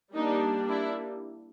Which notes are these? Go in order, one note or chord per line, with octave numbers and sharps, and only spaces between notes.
G3 A#3 D4 D#4
D4 E4